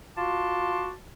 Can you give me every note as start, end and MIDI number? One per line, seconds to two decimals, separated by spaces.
0.16 0.90 65
0.16 0.90 66
0.16 0.90 81
0.16 0.90 84
0.16 0.90 86